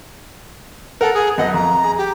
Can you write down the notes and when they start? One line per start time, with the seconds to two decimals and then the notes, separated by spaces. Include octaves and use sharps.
1.01 A4 A#4 F#5
1.14 G#4
1.38 F#2 B3 D#5 F#5
1.54 F2 A#5
1.84 G#4
1.97 G4